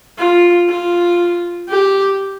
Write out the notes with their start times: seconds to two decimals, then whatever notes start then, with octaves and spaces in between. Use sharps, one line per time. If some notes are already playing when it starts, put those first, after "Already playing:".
0.18 F4
0.69 F4
1.69 G4